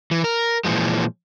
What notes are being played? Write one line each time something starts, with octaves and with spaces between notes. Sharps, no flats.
E3
A#4
A#2 E3 F3 G#3